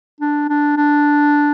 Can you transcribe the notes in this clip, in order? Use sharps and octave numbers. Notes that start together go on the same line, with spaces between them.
D4
D4
D4